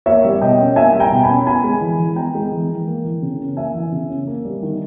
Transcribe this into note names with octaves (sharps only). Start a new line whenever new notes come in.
A#3 C#5 E5
G3
B2 D#5 G5
C#4
A#3 E5 G#5
G3
G5 A#5
B2
G#5 B5
C#4
B3 G#5 B5
G#3
E3
E3
B3 G5 A#5
G#3
E3
E3
A#3
E3
C#3
C#4
A#3 E5 G#5
E3
C#3
C#4
A#3
G3
D#3